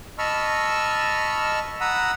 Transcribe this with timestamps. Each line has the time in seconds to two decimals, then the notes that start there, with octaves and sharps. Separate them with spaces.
0.19 D#5 A5 B5 C#6 E6 F6
1.81 F#5 A#5 B5 D#6 E6